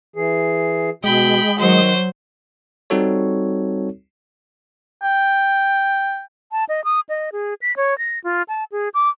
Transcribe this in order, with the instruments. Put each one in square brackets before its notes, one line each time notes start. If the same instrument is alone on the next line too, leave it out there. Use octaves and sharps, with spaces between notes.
[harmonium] E3 G#4
[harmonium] B2 [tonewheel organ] G#3 [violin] G5 B5
[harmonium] D#3 [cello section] F#3 [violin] C5
[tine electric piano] G3 C4 D#4 F#4 A4 C#5
[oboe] G5
[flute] A5
D#5
D#6
D#5
G#4
B6
C#5
A#6
F4
A5
G#4
D6